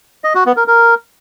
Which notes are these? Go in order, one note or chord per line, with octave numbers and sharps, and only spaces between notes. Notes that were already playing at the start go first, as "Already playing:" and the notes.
D#5
F#4
B3
A#4
A#4